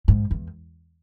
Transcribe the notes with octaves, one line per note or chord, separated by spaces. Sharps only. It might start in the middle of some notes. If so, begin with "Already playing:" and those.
G#2
E2